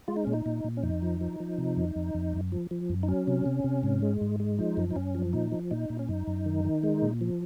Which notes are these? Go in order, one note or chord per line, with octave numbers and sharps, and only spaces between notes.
G#3 F4
D#4
A#2 C#4
D#4
A#2
A#2
C#4
F2 D#4
F3
F3
F3
C3
F2
F2
F2
F#2
F3
F3
F#2
D#4
F#3 C#4
C3
C3
C3
G#2
G#3
G#2
G#3
F3 D#4
F#2
D#4
F#2 C#4
F3
A#2 D#4
F3
A#2 D#4
A#2
C#4
F#2 D#4
F#2
D#3
D#3
G#3
A#2
F3